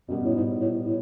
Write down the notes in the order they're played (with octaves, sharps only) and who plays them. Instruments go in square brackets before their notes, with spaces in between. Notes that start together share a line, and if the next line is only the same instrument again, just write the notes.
[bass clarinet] F#2 [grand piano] B2 G3 B3
[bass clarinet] A2
G#2
A2
A2